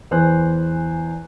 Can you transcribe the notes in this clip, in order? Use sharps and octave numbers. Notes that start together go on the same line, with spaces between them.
E2 E3 C5 G#5 F#6